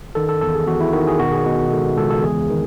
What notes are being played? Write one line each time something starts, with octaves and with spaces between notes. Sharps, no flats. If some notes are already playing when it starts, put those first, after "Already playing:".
D#3 A4
A4
E2 A4
G#4
E2 F#4
E4
D#3 F#4
G#4
B2 F#4
G#4
B2
C#2 A4
C#2 A4
A4
E2 G#4
D#3